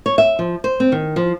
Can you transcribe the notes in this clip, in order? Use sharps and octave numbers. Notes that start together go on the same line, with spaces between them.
C#5
E5
F3
C5
C4
D#3
F3